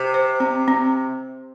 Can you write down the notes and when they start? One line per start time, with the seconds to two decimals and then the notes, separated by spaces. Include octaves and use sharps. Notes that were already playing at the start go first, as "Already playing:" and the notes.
Already playing: C3
0.14 C5
0.40 C4
0.68 C4